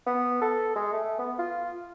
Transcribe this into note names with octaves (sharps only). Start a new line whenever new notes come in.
B3
A4
G#3
A3
B3
F4